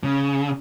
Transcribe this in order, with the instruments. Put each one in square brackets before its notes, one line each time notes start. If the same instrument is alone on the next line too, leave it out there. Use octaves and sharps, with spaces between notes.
[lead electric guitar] C#3